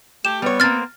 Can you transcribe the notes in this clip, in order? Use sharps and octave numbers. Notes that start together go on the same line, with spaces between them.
A3 G4 E7
G3 B3 C#5
A#3 C4 F6 A6